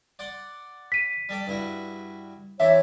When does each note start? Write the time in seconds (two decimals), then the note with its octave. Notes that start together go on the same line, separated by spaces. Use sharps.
0.19 D5 F#5 C6
0.92 B6 D#7
1.29 G3 A4 D5
1.47 G2 E4 F#4
2.60 E3 C4 D4 C#5 E5